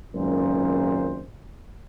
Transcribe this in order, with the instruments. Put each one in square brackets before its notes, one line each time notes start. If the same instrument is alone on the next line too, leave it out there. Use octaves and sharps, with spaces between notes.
[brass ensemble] G#1 C#2 F#2 A#2 C5